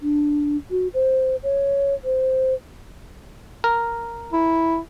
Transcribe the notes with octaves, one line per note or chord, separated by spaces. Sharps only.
D4
F#4
C5
C#5
C5
A#4
E4